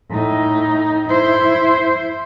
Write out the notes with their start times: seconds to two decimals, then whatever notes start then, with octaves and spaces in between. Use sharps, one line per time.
0.11 A2 D#4
1.08 E4 C5